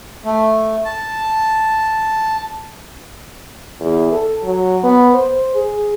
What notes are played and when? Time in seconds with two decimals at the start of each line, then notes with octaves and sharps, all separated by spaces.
0.25 A3
0.85 A5
3.80 E2
4.13 A4
4.44 F#3
4.84 B3
5.14 C5
5.55 G#4